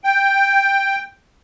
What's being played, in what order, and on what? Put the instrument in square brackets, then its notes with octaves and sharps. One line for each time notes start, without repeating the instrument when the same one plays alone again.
[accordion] G5